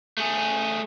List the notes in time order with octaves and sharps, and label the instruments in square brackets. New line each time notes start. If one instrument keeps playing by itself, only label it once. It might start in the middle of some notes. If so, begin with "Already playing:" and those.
[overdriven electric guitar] A3 G#4